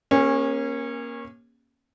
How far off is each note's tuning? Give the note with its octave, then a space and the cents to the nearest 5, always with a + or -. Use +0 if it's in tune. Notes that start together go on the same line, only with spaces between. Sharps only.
A#3 +20 C#4 -20 G#4 -30